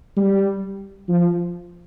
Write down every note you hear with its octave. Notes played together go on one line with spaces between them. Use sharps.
G3
F3